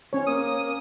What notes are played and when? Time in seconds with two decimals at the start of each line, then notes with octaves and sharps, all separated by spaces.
0.13 C4 C#4 C#5
0.27 A#3 D#6